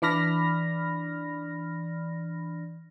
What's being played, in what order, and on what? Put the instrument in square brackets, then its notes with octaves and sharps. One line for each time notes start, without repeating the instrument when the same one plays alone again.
[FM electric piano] E3 D4 D5 B5 F6 A#6